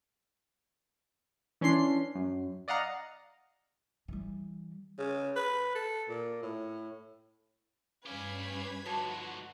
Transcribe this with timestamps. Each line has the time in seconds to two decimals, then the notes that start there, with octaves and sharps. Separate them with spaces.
1.61 E3 C#4 D4 C6 C7
2.15 F#2
2.68 D5 D#5 F5 F#5 A#5
4.08 E3 G3
4.99 C#3
5.36 B4
5.75 A4
6.09 A#2
6.42 A2
8.06 G2 C#4 G4 B4 F5 G#6 B6
8.86 G#2 D3 F3 F#4 C#5 A5